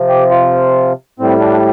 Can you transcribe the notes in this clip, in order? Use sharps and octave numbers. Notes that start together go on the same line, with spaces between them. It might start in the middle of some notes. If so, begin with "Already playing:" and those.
Already playing: C3 F3
G4
F4
A2 G3 C4
D4